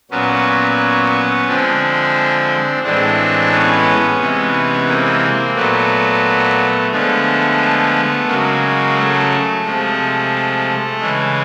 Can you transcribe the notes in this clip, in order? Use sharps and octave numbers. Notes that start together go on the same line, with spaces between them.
A#2 F#3 B3 C#4
D3 F3 G#3 C4 D4
A2 E3 G#3 C4 D4
B3 C#4
C3 E3 G#3
A#3 C4
A#2 F#3 A3 B3
D3 F3 G#3 A3 B3
C#3 F#3 G#3 A#3
A3
C3 F3 G#3
C#3 E3 G#3